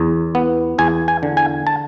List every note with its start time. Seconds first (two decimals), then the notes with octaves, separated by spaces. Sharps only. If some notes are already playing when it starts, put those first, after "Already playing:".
Already playing: E2
0.35 B3
0.78 E2 G#5
1.08 G#5
1.23 D3
1.37 G#5
1.67 A5